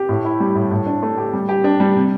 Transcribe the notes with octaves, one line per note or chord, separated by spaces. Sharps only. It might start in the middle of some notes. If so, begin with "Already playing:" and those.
Already playing: G4
A2
E4
G3
A2
A2
D4
A3
G4
G3
G4
D4
G3
C3